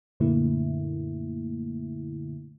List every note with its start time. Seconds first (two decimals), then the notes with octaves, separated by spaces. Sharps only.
0.20 F#2 A#2 D3 A3 A#3 E4